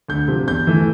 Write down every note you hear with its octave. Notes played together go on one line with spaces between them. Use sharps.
D2 G6
C3 F3
E2 G6
E3 A3